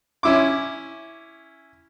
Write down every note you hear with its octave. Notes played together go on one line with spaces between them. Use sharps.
C#4 E4 D6